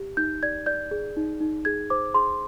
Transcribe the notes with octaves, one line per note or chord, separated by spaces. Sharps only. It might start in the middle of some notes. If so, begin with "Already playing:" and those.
Already playing: G4
D#4 G6
D5 G#6
D5 G6
G#4
D#4
D#4
G#4 G#6
C5 D6
G#4 C6